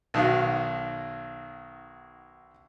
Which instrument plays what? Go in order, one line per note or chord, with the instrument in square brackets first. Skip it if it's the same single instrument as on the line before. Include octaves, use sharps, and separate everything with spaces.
[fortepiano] B1 D#3 F#4 F5